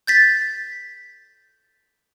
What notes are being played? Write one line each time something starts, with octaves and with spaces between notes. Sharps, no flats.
G6 A6 B6